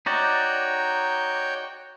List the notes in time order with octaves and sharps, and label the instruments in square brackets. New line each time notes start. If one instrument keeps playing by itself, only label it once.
[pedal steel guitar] D#4 F#4 D5 [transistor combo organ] C#5 G5